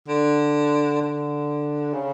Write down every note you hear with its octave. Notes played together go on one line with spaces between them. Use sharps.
D3
D3
C#3